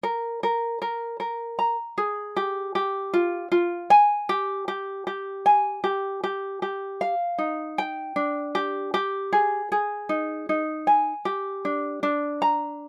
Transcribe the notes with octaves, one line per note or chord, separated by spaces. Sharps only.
A#4
A#4
A#4
A#4
A#5
G#4
G4
G4
F4
F4
G#5
G4
G4
G4
G#5
G4
G4
G4
F5
D#4
G5
D4
G4
G4
G#4
G#4
D#4
D#4
G#5
G4
D4
D4
A#5